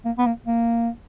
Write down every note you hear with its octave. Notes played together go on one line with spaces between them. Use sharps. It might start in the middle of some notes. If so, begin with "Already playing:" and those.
A#3
B3
A#3
A#3